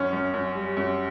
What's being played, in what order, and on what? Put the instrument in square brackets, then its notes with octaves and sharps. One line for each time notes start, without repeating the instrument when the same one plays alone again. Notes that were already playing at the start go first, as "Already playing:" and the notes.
Already playing: [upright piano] F#2 C#4
F#2
F#2
G3
F#2